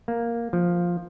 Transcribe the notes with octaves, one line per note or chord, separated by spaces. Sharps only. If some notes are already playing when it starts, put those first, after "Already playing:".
A#3
F3